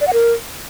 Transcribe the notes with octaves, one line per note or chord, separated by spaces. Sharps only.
D5
F#5
A#4